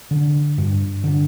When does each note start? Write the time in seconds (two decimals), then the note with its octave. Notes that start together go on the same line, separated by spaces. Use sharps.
0.11 D3
0.58 G2
1.04 D3